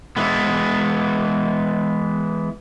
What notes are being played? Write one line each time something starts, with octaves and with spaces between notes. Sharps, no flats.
E3 G#3 B3